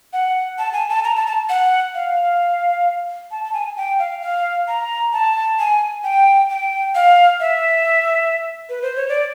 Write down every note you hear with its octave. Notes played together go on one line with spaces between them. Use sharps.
F#5
A5
G#5
A5
A#5
A5
A5
F#5
F5
A5
A5
G#5
G5
F5
F5
A#5
A5
G#5
G5
G5
F5
E5
B4
C5
C#5
D5